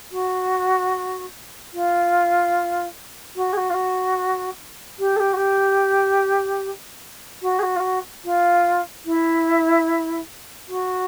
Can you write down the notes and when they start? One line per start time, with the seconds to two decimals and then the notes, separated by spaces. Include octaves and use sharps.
0.12 F#4
1.73 F4
3.36 F#4
3.53 G#4
3.57 F#4
3.70 F4
3.74 F#4
4.99 G4
5.16 A4
5.20 G4
5.33 F#4
5.37 G4
7.42 F#4
7.59 G#4
7.63 F#4
7.76 F4
7.80 F#4
8.25 F4
9.05 E4
10.68 F#4